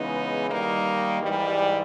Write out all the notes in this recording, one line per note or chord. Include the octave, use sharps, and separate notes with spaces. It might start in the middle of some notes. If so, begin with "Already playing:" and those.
Already playing: C#3 E3 G#3 B3 D#4
D#3 G3 A#3 D#4
G#2 E3 G3